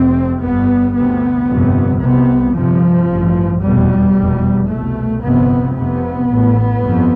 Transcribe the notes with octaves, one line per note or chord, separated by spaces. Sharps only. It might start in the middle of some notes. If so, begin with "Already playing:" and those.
Already playing: F1 F2 C3 C4
G1 G2 B3
D2 C3 B3
G1 F2 C3
C2 C3 B3
G1 F2 C3 F3
A1 G2
F1 E2 B2 G3
F1 E2 B2
C2 B2 A3
G1 F2 C3 B3
F1 F2 C3 B3
A1 A2
G1 F2